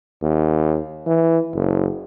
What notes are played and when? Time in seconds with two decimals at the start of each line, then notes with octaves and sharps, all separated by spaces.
0.22 D#2
1.06 E3
1.55 F#1